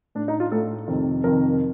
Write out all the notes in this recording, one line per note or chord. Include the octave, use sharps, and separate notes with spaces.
A2 D4
D#4
F4
A2 A4
F2 C3 D#3
F2 C3 D#3 A#4